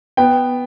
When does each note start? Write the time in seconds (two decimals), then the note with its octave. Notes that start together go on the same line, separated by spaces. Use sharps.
0.17 B3 G5